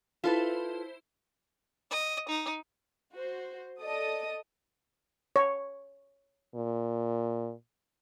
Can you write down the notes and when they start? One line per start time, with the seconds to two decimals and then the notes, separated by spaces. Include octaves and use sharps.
0.24 E4 F4 A4 B4 C5
1.90 D#5
2.29 D#4
3.12 F#4 C5
3.83 A4 D5 D#5 D#6
5.36 C#5
6.55 A#2